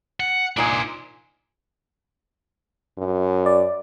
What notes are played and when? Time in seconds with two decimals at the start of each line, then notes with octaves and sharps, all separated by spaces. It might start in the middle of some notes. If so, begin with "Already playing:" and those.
0.20 F#5
0.57 A#2 D4 D#4 C5 G#5
2.98 F#2
3.46 D5